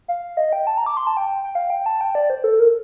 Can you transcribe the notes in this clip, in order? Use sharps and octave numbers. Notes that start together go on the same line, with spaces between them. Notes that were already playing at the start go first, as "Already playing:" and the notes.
F5
D#5
G5
A5
A#5
D6
C6
A5
G5
G5
F5
G5
A5
G5
D5
C5
A4
A#4